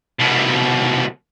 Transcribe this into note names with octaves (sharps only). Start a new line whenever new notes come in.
C2 B2